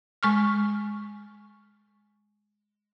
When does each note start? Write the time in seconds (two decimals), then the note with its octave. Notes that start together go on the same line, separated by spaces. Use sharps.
0.23 G#3 C#6 F6